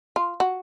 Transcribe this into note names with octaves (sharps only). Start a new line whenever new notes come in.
F4
F#4